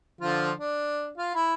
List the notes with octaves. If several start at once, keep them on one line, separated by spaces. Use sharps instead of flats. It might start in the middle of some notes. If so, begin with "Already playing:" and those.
D3 F3 F4
D4
F4 F5
E4 B5